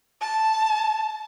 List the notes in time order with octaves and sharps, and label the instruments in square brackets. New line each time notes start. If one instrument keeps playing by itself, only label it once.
[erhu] A5